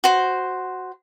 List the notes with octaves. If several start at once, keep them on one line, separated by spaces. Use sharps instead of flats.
F#4 C5